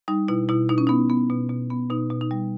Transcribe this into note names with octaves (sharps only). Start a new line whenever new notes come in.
G3 D#4
B2 E4
B2 E4
B2 D#4
C#4
B3 D#4
B3
B2
B2
B3
B2 D#4
B2
D#4
G3